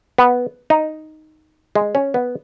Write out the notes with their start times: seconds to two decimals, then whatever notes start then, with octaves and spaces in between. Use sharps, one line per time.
0.18 B3
0.70 D#4
1.75 G#3
1.95 C#4
2.14 B3